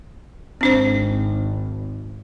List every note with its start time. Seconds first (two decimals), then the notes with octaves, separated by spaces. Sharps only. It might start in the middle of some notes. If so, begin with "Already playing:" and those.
0.61 G#1 C4 D4 C5